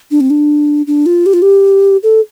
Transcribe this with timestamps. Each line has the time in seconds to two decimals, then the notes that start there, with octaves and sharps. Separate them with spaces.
0.11 D4
0.21 C4
0.30 D4
0.87 D4
1.06 F4
1.26 G4
1.33 F4
1.42 G4
2.03 A4